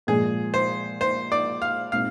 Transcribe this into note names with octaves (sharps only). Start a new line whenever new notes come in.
A#2 F3 G#3 G#4
C5
C5
D5
F5
A#2 G#3 C4 D#4 F5